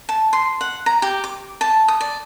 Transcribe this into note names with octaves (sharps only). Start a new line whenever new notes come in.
A5
C6
F#5
A#5
G4
D6
A5
D#6
D5